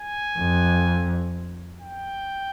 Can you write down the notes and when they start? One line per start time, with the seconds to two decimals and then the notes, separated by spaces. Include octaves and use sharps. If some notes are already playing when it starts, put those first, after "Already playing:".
Already playing: G#5
0.39 F2
1.81 G5